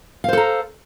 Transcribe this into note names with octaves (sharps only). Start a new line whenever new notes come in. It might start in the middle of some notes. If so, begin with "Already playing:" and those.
A4 C5 F5 A#5